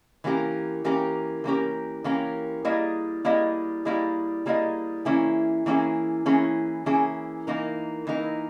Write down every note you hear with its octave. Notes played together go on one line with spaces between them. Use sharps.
E3 A#3 C#4 G4 A#4
E3 A#3 C#4 G4 A#4
E3 A#3 C#4 G4 A#4
E3 A#3 C#4 G4 A#4
G3 A#3 E4 G#4 D#5
G3 A#3 E4 G#4 D#5
G3 A#3 E4 G#4 D#5
G3 A#3 E4 G#4 D#5
E3 A#3 C#4 E4 G#4
E3 A#3 C#4 E4 G#4
E3 A#3 C#4 E4 G#4
E3 A#3 C#4 E4 G#4
E3 A#3 D#4 A#4
E3 A#3 D#4 A#4